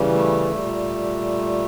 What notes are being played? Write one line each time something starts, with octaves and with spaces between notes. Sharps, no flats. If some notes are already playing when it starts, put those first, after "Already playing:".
Already playing: C#3 E3 G3
A3
A#2 G3